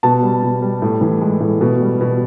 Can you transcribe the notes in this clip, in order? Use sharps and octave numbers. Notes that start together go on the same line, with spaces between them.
B2 A5
G3
B2
G3
A2
E3
G#3
A2
B2
G3
B2